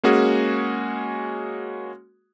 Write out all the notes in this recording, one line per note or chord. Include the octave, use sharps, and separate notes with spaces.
G#3 A#3 C#4 F#4 G#4